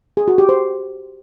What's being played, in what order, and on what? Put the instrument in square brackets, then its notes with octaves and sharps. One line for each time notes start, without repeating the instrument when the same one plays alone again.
[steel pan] G#4
F#4
G4
C5